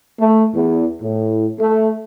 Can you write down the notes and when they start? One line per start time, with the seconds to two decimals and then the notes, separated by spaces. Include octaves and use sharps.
0.20 A3
0.55 E2
1.02 A2
1.60 A3